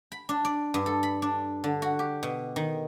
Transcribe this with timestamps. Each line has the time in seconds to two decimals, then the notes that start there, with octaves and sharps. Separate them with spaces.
0.12 B5
0.29 D4
0.45 D5
0.74 G2
0.86 A4
1.03 B5
1.22 D4
1.64 D3
1.82 F#4
1.99 G4
2.23 B2
2.56 D#3